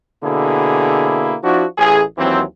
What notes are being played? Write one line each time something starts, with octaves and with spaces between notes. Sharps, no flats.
B2 D3 A#3 E4 G#4
F3 D4 E4 F#4
A1 G#4
D#2 E3 F#3 C4